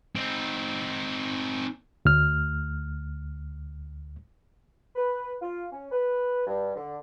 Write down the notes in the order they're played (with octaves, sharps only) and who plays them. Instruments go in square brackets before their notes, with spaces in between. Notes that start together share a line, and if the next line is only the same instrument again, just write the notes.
[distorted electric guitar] C4 D#4
[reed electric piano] D2 F6
[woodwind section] B4
F4
C#4
B4
G2
D3